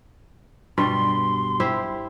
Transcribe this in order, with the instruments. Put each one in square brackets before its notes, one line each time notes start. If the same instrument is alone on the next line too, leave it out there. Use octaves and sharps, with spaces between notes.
[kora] G2 B2 G3 [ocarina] C6
[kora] E4 G4 C5